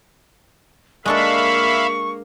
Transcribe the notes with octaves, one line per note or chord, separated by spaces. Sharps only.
G#3 A#3 D4 A4 E5 F5 B5 C#6